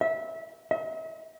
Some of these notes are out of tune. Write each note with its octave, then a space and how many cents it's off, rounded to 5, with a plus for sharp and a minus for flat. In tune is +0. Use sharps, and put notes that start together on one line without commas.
E5 -20
E5 -45